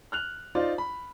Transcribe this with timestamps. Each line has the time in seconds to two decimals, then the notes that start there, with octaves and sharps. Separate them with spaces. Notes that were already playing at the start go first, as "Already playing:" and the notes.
0.12 F6 F#6 F7
0.55 D#4 F4 C5 D5
0.78 B5